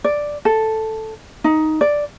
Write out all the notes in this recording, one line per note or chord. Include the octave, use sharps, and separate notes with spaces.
D5
A4
D#4
D5